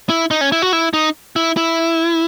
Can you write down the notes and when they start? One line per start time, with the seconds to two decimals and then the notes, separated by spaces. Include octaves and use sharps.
0.09 E4
0.31 D#4
0.41 C#4
0.52 E4
0.62 F#4
0.73 E4
0.93 D#4
1.36 E4
1.57 E4